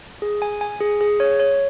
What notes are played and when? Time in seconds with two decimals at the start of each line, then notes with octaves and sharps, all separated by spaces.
0.22 G#4
0.42 G#5
0.61 G#5
0.80 G#4
1.01 G#4
1.20 C#5
1.40 C#5